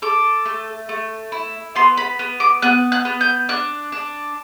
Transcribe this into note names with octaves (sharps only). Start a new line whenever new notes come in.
A4 D6
A3
A3
E4
B3 C6
B5
B3
D6
B3 F#6
F#6
B3
G6
D4 F#6
D4